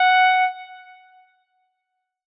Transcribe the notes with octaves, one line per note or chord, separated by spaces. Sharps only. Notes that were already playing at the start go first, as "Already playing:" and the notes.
Already playing: F#5